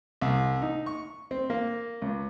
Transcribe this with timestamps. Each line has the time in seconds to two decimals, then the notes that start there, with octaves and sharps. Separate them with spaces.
0.22 C2
0.62 D#4
0.86 C#6
1.31 C4
1.50 A#3
2.02 C#2